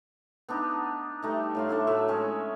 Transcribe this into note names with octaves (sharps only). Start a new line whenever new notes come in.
B3 D4 D#4
G3 A3 D#4
A2 F4 F5
A3 D4 E4
A2 F#3 E4 E5
G#3 C#4 G#4